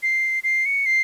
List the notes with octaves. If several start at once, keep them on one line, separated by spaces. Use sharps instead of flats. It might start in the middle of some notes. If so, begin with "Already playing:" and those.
C7
C7
C#7
C7